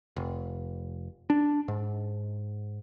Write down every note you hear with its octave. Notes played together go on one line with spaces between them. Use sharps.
F1
D4
G#2